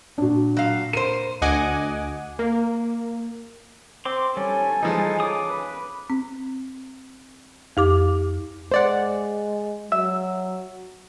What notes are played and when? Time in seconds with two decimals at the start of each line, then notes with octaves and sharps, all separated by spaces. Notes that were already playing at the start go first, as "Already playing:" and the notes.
0.18 A#2 D4 F#4
0.57 F#3 F5
0.93 A#4 C5 D#7
1.42 D2 D#5 F#5 G#5 D6
2.39 A#3
4.05 C4 C6 D6
4.37 G3 C#4 A4 G#5
4.82 E3 F3 G#3 D#4
5.20 C#3 D6 D#6
5.49 B4
6.10 C4
7.77 F2 G4 D6
8.72 G#3 C5 D5 F#5
9.92 F#3 E5 E6